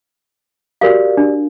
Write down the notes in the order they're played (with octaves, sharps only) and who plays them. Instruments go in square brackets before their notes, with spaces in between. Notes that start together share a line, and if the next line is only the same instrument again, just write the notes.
[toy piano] F#4 A#4 F5 [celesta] G4 D5
[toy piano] D4